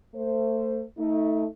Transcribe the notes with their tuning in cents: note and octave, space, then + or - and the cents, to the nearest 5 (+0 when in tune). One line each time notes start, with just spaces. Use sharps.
A3 +30 C5 +0
A3 +5 D#4 +30